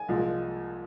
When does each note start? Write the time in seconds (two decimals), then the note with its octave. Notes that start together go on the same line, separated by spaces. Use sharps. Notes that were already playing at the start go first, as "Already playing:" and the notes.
Already playing: G#5
0.08 C2 A#2 F3 G#3